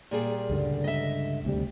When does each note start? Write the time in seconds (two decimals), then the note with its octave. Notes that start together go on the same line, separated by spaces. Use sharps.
0.11 A#2 G3 G#4
0.50 C#2 G2 D3
0.84 D#5 E5
1.45 D2 C3 G3